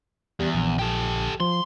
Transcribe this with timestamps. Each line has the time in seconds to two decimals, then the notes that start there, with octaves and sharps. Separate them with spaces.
0.40 E2 G3
0.54 A#1
0.79 G4 A4
1.40 F3 C6